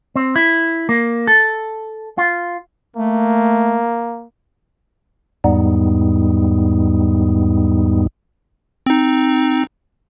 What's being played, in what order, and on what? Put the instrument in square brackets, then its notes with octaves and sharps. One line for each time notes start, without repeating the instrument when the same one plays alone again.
[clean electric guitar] C4
E4
A#3
A4
F4
[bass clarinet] A3 [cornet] A#3
[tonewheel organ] E2 G#2 G3 B3 D#4
[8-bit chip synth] C4 D#4